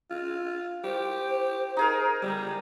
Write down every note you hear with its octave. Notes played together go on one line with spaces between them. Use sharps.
F4
G4 C5
D#4 G#4 A#4
G3